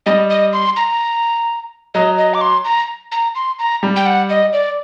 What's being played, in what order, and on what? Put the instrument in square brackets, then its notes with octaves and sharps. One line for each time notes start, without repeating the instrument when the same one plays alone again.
[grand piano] G3 [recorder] D#5
[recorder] D#5
C6
A#5
[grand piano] F#3 [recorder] D#5
[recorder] D#5
D6
C6
A#5
A#5
C6
A#5
[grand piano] G3
[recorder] G5
F#5
D#5
D5